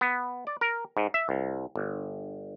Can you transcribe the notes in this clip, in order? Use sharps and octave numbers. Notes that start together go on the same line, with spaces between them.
B3
D5
A#4
G#2
E5
C2
G1